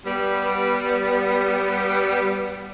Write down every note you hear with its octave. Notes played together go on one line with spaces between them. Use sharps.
G3 B3